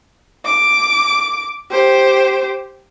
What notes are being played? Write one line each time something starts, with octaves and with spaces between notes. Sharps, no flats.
D6
G4 C5